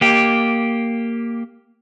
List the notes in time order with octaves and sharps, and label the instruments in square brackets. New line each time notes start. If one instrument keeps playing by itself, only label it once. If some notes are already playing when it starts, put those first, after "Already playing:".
[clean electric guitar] A#3 G4